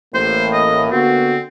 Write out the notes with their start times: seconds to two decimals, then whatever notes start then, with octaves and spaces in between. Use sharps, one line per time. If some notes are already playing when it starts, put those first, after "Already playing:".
0.15 A1 A2 A#3 C5
0.53 D#5
0.92 D3 B3 C4 F#4